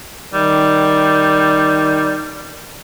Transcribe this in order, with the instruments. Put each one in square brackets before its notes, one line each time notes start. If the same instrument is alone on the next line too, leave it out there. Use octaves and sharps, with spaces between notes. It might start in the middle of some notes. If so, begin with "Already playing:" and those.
[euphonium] D#3 [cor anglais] G3